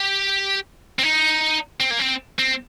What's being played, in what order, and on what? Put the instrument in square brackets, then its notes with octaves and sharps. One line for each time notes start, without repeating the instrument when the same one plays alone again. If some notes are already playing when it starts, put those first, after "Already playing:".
Already playing: [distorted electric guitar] G4
C4
D#4
C4
A#3
C4
C4